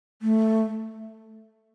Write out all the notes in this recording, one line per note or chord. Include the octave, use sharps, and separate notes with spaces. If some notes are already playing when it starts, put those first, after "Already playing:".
A3